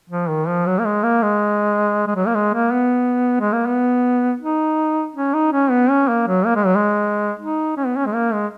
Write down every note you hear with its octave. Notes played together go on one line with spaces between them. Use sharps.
F3
D#3
F3
F#3
A#3
G#3
A#3
G#3
G#3
F#3
A#3
G#3
A#3
B3
G#3
A#3
B3
D#4
C#4
D#4
C#4
B3
C#4
A#3
F#3
A#3
G#3
F#3
G#3
D#4
C#4
B3
C#4
G#3
A#3
G#3